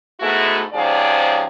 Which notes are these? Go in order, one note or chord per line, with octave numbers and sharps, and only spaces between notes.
G#2 G#3 A3 B3 E4 F#4
G#2 C3 F3 C#4 G#4 D5